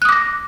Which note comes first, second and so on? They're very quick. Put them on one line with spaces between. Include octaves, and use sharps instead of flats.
F#6 D#6 D6 A#6